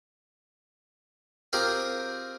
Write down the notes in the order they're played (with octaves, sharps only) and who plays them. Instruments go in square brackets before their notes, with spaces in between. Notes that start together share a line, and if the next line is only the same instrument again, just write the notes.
[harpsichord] C4 F4 G4 G#4 A#4